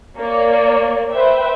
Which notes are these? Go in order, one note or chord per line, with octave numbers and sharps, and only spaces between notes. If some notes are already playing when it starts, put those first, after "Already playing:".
A#3 C#5 D5
B4 C5 E5 G5